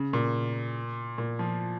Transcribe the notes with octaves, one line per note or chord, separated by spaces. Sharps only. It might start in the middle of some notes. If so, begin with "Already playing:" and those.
Already playing: C#3
A#2
A#2
F3